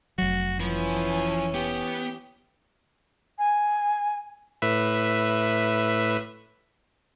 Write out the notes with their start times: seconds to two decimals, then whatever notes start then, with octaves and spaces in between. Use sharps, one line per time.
0.18 F1 F#3 F#4
0.60 E3 F3 B3 C#4
1.54 B3 G4
3.38 G#5
4.62 A2 B4 E5